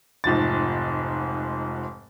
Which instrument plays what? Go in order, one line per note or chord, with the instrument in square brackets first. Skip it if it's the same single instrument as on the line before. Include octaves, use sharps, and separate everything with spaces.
[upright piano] F1 G#2 F3 A6